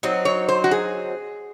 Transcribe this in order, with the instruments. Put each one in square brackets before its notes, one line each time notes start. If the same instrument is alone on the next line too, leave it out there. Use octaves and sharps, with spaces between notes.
[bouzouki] F#3 C4 D#4
[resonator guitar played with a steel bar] C#5
C5
F#4
G#4